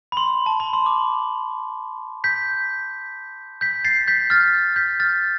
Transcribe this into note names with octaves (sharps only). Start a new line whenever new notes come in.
B5
C6
A5
B5
C6
D6
G6 B6
G6 B6
A6 C7
G6 B6
F6 A6
G6 B6
F6 A6